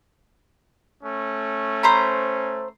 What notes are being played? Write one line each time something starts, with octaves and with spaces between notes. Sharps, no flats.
A3 C#4
C5 A#5 B5